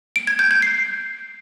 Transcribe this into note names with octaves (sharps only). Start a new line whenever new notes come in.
D7
G#6
G6
G6
C7